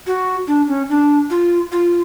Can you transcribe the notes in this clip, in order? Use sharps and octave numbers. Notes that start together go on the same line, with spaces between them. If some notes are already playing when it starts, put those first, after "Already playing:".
F#4
D4
C#4
D4
F4
F4